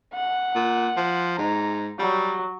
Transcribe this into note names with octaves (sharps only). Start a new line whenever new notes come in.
F#5
A#2
F3
G#2 A#5
F#3 G3